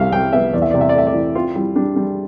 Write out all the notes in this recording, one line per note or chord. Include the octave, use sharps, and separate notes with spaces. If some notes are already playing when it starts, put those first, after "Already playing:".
Already playing: C2 G3 E5 F5
C2 G5
B3 E5
E2 D5
E5
C3 D5
E5
D5
A3 E5
D5
E3
C4 F4
G3 E4
G3 D4
G3 D4